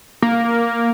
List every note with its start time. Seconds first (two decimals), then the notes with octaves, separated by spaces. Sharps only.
0.22 A#3